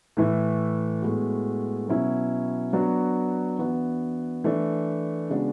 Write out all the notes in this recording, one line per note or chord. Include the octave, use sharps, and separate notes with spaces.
A2 E3 A3 E4
A2 G#3 B3 F#4
B2 F#3 C#4 E4
F#3 B3 D4 F#4
E3 B3 D4 F#4
E3 A3 D4
C#3 G#3 B3 D4 F#4